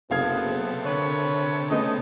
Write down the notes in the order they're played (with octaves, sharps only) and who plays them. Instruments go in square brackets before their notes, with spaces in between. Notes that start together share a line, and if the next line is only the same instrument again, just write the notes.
[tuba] F#1 [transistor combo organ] C3 A4 [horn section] B3 [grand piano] G#4 F5 G#6
[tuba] D3 [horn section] A#4 B4 C#5
[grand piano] C#3 A3 B3 [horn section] C#4 D#4 D#5